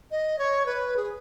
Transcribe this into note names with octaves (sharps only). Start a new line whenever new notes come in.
D#5
C#5
B4
G#4